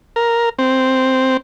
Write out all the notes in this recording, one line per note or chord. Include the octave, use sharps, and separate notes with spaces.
A#4
C4